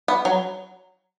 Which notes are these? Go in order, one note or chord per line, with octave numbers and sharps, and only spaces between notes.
B3
F#3